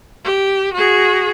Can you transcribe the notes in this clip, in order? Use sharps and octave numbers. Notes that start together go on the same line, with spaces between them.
G4
F#4 G#4